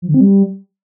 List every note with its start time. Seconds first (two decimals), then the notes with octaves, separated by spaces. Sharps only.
0.02 F3
0.08 D3
0.14 C4
0.21 G3